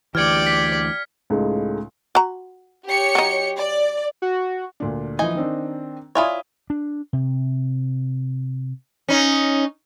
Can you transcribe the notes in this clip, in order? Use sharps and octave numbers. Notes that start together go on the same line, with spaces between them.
D2 E3 G4 D5 F6 G#6 C#7
B6
C#2 A2 G#3 D#4
F#4 A#5
G4 C#5 C#7
F#3 D#4
D5
F#4
D2 A#2 D4
E3 F3 D#4 D#5 G#5
D#3 C4 D4
E4 F4 C#5 D5 G#5 D#6
D4
C3
C#4 D#4